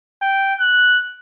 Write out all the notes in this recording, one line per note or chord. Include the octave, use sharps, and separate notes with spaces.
G5
F#6